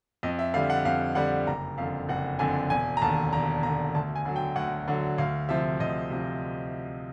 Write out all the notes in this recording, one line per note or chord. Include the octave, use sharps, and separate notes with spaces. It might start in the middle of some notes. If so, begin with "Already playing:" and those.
F2 D#5
E5
D3 G3 F5
F#5
F2 F5
D3 G3 F#5
F#1 A#5
F2 D3 F5
F#1 F#5
F2 D3 G#5
E1 G#5
A#5
D#2 D3 A5
E1 A#5
D#2 D3 A#5
D2 A5
G#5
D3 F#3
G5
D2 F#5
D3 F#3
D2 F5
C3 F3 E5
D2 D#5
C3 F3